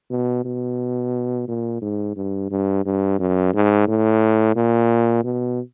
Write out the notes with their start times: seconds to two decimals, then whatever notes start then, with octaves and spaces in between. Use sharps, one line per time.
0.10 B2
0.45 B2
1.48 A#2
1.82 G#2
2.16 G2
2.51 G2
2.85 G2
3.19 F#2
3.54 G#2
3.87 A2
4.56 A#2
5.24 B2